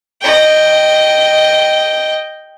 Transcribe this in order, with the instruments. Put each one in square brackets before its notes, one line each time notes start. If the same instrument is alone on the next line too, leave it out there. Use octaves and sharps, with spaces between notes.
[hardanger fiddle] D#5 G5